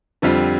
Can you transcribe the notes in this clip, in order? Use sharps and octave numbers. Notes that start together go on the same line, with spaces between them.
F2 D3 G3 C4 F4